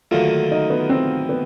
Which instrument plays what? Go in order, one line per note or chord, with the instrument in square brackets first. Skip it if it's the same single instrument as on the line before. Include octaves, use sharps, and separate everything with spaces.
[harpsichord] D#2 D3 F#3 A3 [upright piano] F4
[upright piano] D#4
B3
C4
B3